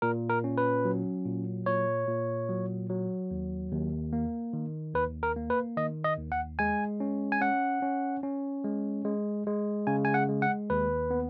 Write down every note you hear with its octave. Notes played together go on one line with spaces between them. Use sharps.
A#2 A#4
A#4
C#4
B4
F#3
A#2
A#2 C#5
A#2
F#3
F#3
D#2
D#2
A#3
D#3
D#2 B4
A#4
A#3
B4
D#3 D#5
D#5
D#2
F#5
G#3 G#5
C#4
G#5
C#4 F#5
C#4
C#4
G#3
G#3
G#3
C#3 G#5
G#5
F#5
G#3
F#5
D#2 B4
B3